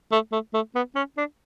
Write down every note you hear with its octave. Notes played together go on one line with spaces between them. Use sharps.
A3
A3
A3
B3
C#4
D4